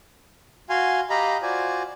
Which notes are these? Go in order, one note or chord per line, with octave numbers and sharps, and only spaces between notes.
F#4 F5 G#5 C6
G4 D#5 F5 A#5 B5
F4 F#4 C5 D5 G#5